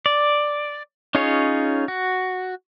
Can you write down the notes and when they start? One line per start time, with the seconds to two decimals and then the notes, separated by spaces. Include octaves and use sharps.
0.06 D5
1.15 C#4 D#4 F4 G#4 C#5
1.88 F#4